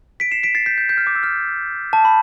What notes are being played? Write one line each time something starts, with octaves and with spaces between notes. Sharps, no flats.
B6 D7
C7 E7
B6 D7
A6 C7
G6 B6
G6
G6
F6
D6
E6
F6
A5
B5